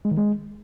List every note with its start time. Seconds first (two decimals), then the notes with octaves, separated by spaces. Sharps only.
0.05 G#3
0.11 D#3
0.17 G#3